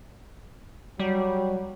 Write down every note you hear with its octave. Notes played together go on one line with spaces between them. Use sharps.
F#3 G3